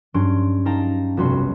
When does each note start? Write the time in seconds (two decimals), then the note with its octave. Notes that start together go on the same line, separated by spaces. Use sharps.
0.14 G2 F#3 C#4 C6 D7
0.65 D#4 F5 G5 A5 A#5
1.17 F1 B1 G3 F#4 B5 C6